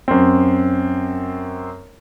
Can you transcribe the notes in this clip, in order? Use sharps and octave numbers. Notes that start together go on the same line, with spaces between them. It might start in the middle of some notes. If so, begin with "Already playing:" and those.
F#2 C4